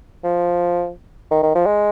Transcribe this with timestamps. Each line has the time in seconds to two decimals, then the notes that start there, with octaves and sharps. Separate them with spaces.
0.24 F3
1.31 D#3
1.43 D#3
1.55 F3
1.66 G#3